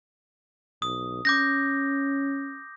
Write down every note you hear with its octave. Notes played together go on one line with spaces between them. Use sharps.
B1 D#6
C#4 D6 G6 A#6